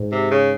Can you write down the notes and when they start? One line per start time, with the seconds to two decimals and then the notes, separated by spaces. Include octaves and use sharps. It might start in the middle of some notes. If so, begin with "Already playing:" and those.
Already playing: G#2
0.12 C3
0.31 C#3